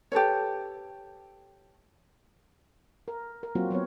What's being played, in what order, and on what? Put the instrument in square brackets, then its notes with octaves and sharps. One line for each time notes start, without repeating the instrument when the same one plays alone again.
[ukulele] G4 A4 B4 C#5
[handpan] A#4
A#4
F#3 A#3 C4 F4 F#4
F#3 B3 C4 C#5